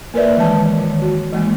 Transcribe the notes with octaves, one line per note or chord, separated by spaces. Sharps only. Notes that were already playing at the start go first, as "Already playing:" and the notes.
A#3 A#4 B4 D5 E5
D#3 E3 G#3 A5
D#3
F#4
E3 G#3 A#3